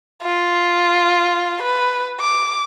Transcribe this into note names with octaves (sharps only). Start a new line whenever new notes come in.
F4
B4
D6